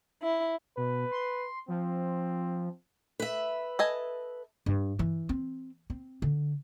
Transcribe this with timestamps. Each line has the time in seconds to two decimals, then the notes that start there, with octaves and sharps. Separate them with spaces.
0.21 E4
0.77 B2 B4
1.11 C6
1.68 F3 C4
3.20 B4 E5
3.79 A4 D#5 G#5
4.66 G2
4.99 E3
5.29 C4
5.90 C4
6.22 D3